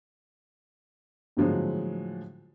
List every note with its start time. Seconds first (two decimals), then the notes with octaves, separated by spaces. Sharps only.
1.37 A2 D3 F3 F#3 G#3